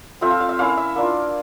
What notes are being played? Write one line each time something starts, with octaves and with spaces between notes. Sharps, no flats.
F3 A3 C4 F4 E5
F5
F5
E5
A#3 C#4 E4 F5
E5
A#3 D4 F4